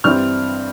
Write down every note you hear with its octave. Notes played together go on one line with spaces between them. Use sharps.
G2 E3 G3 C4 F6